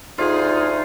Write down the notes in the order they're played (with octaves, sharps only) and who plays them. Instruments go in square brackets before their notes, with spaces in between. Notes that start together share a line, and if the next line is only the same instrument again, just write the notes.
[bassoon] D2 [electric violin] D#4 [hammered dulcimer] F4 [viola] G#4